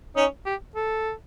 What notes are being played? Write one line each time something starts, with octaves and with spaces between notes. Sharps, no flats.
C#4 D#4
G4
A4